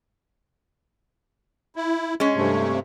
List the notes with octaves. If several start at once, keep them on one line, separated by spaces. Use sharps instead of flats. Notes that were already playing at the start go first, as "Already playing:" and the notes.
E4
G#3 C#4
G2 C3 A3